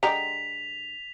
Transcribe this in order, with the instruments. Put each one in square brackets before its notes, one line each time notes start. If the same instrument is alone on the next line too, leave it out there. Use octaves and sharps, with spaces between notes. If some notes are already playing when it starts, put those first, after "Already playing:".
[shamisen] D3 G#3 G4 [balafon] A#5 [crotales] B6 F7